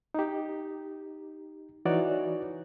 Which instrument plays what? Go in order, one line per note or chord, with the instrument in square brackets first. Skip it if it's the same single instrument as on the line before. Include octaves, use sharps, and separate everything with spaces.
[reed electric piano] D#4 G4
E3 D#4 F#4 C#5 D5